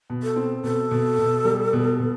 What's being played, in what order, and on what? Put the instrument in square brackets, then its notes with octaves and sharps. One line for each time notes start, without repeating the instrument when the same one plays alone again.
[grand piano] B2
[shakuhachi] A4
[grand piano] C4
[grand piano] B2 [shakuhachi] A4
[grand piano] B2
B2
G3
B2
B2